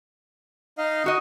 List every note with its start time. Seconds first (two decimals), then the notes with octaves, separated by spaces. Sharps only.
0.78 D#4 D#5 F5
1.04 D#4 F#4 D#5